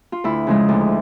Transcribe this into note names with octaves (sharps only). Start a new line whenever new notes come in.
F4
D2 E4
C#3 F3 G#3
D2